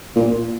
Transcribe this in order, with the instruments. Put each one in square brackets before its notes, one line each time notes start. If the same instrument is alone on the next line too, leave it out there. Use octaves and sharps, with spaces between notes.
[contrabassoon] A#2